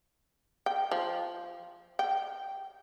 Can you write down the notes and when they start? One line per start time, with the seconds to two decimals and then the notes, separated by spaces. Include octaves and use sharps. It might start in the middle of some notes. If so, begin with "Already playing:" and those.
0.66 G5
0.91 F3
1.99 G5